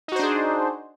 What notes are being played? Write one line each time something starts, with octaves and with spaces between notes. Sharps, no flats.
D4 D#4 F#4 G#4 C5